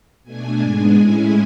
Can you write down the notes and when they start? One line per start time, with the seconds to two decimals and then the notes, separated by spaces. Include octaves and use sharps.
0.23 B2 A3 D4 G#5
0.59 G#2 G#3 B3 D4
0.95 A2 G#3 C#4 E4